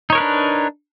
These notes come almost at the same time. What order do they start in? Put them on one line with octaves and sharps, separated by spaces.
D#4 C#5 A#4 B4 D4